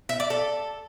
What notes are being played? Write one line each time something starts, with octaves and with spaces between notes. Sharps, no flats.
E5
D5
A4